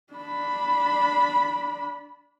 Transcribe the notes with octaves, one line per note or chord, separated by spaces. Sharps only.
D4 B5